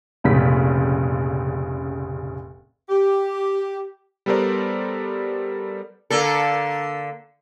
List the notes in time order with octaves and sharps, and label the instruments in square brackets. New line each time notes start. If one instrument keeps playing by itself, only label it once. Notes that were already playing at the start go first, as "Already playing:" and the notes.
[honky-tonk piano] F1 A#1 C#3 C#4 B6
[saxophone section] G4
[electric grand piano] G3 B3 A4 A#4 C5 D5
[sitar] D3 A#3 A4